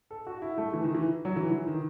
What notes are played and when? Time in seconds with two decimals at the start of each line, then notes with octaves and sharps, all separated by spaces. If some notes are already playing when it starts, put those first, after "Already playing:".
0.11 A4
0.27 F#4
0.42 E4
0.58 A3
0.73 E3
0.84 D#3
0.94 E3
1.25 F#3
1.36 E3
1.52 E3
1.67 D#3